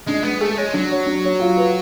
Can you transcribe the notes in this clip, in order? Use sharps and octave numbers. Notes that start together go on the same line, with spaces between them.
G#3 D4
G#3 B3
A3 G#4
G#3 C#5
F#3 D4
C#5
D4
C#5
F4
B4